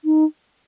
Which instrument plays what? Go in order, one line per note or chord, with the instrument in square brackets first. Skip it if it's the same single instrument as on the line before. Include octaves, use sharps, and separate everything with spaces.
[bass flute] D#4